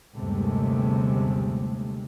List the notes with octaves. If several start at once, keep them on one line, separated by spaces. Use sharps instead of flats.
G1 D#2 C3 G#3 A3